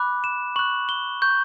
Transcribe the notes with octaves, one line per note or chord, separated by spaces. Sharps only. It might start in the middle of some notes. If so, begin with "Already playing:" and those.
Already playing: B5 D6 F#6
E7
C#6 F#6 F#7
G7
C#6 G6